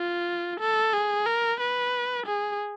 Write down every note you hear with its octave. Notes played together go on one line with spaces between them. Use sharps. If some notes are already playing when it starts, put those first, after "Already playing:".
Already playing: F4
A4
G#4
A#4
B4
G#4